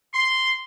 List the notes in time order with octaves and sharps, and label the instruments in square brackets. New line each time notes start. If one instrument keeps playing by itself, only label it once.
[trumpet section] C6